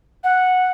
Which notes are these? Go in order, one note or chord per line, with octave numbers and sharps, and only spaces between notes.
F#5